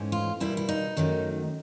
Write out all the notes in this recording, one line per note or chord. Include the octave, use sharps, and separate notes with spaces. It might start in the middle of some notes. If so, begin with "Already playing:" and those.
Already playing: G#2 E3 A3 C#4
F4
B2 G3 A#3 D4 E4
E4
D#4
F#2 D#3 F#3 A3